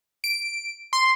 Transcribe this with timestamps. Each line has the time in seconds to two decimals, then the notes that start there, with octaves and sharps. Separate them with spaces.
0.24 D7
0.93 C6